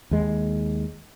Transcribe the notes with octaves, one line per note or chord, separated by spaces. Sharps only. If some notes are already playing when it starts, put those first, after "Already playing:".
D#2 G#3